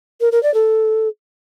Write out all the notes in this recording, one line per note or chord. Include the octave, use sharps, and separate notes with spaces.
A#4
A#4
D5
A4